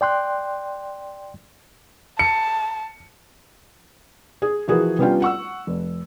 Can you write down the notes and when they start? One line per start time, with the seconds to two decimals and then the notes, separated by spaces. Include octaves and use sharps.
0.01 D5 G5 C6 F#6
2.19 A5 C#7
4.42 G#4
4.68 E3 F3 F#4 G#4 A#4 B4
4.99 G3 B3 C#4 D4 F4 G5
5.22 F#5 C#6 E6
5.67 F1